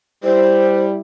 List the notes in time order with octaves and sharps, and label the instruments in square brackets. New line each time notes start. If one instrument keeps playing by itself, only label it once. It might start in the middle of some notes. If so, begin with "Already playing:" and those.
[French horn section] G3 E4 [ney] C5